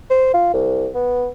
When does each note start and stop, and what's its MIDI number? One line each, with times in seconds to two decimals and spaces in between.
0.10 0.30 72
0.34 0.50 65
0.53 0.89 36
0.94 1.29 59